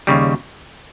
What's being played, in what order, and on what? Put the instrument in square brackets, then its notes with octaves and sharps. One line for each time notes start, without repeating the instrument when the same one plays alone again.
[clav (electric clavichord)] D#2 C#3 G3